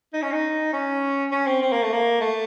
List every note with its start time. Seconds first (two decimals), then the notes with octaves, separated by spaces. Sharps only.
0.13 D#4
0.22 C#4
0.32 D#4
0.73 C#4
1.32 C#4
1.47 C4
1.62 C4
1.72 A#3
1.83 A3
1.93 A#3
2.21 A3